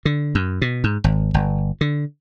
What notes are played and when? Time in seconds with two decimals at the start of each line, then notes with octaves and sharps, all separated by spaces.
0.05 D3
0.35 F#2
0.62 B2
0.84 G#2
1.04 G#1
1.34 G1
1.81 D3